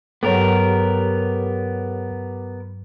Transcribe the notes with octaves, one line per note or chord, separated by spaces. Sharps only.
G2 F#3 B3 G4 A4 A#4 C#5